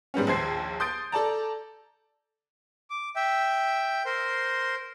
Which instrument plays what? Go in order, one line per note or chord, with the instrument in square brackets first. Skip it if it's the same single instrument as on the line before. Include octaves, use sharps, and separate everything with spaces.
[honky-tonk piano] G#2 G3 B3 C#4
A#1 D#2 C5 G#6 C7
C6 D#6 G6 A6 D7
A4 D5 A5 A#5
[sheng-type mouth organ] D6
E5 G5
A#4 C5 C6